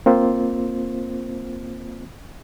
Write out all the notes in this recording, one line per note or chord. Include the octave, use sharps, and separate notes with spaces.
A#3 C4 F4 C5